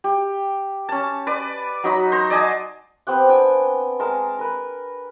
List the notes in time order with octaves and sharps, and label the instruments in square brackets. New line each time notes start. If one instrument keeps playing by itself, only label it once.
[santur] G4
C#4 A5
B4 D5
F#3 D#4 F#4 B5
C5 A#5
D5 D#5 G#5 A5
B3 C4 G4 F#5
D4 G5 G#5
G#3 A#4 A5 A#5
A#4 B4